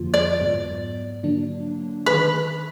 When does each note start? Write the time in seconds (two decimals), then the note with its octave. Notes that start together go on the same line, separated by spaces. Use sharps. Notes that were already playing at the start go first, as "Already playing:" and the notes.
Already playing: F2 D3 F3 A#3 F4
0.14 D5
0.41 G#2 F#3 B3
1.23 D3 F#3 A#3 D4
2.06 D#3 B4